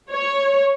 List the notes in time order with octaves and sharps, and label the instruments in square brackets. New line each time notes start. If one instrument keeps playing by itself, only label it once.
[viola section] C#5